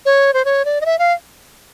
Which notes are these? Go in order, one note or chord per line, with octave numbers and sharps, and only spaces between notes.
C#5
C5
C#5
D5
D#5
E5
F5